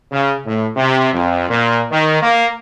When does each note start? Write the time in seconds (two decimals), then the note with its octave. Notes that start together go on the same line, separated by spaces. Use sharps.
0.12 C#3
0.46 A2
0.76 C3
1.13 F2
1.50 A#2
1.92 D#3
2.22 A#3